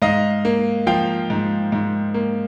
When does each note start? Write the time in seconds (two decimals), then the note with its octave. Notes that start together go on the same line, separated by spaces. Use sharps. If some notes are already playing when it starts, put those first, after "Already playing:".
0.02 G#2 D#5 F5
0.45 A#3
0.87 F3 F5 G5
1.30 G#2
1.72 G#2
2.14 A#3